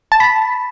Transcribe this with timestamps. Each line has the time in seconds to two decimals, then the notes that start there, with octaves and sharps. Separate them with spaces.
0.12 A5
0.20 B5